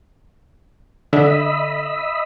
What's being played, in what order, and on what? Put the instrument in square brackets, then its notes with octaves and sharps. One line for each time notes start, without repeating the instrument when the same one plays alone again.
[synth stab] D3 [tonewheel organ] D#5 E5 B5